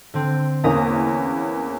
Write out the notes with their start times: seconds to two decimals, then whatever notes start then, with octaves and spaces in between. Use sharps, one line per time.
0.14 D3 C4
0.64 E2 A#3 C#4 A#5 D#6